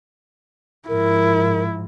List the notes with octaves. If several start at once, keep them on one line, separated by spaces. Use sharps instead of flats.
G#2 F3 E4 A#4